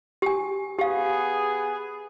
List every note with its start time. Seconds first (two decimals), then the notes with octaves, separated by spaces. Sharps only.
0.22 G4 G#5
0.79 B3 G4 G#4 F5